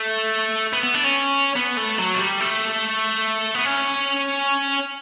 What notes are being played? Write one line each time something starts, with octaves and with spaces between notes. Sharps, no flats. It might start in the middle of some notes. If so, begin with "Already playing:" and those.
Already playing: A3
B3
B3
D4
C#4
B3
A3
F#3
A3
G3
A3
B3
C#4